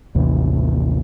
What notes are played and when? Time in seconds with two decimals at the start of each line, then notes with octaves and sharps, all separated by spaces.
0.15 A1 D#2 C3 E3